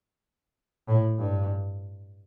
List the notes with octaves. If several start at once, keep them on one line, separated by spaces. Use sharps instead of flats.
A2
G2